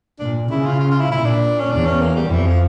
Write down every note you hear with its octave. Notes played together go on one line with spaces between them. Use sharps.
A#2 D4
C#3 E4
F4
F4
F4
E4
A#2 E4
D4
C#4
E2 D4
C#4
A#3
G3
F2 E3
F3